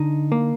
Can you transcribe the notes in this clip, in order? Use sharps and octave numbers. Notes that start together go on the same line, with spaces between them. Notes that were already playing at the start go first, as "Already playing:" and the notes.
Already playing: D3 D#4
A#3